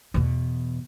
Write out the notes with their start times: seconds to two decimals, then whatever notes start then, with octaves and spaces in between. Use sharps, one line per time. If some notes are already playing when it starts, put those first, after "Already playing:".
0.14 E2 B2